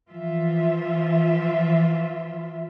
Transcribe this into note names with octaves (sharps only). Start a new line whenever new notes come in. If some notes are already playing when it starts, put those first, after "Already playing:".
E3 F3 F4 E5